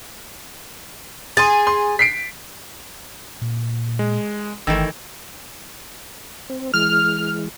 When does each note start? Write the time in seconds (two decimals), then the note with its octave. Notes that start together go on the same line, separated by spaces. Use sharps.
1.37 G#4 C6 A6
1.67 C6
1.99 B6 C7 D7
3.41 A#2
3.99 G#3
4.67 G1 D#3 E3 A3 G5 E6
6.49 C4
6.74 E3 G#3 F6